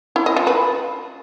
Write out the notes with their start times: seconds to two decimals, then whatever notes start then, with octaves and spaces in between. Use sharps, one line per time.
0.16 E4
0.26 D#5
0.36 F4
0.47 B4